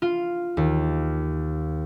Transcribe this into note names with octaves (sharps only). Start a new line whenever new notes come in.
F4
D#2